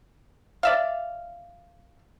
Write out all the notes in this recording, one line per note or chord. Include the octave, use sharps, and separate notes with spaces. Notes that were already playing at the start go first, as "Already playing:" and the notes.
D5 E5 F5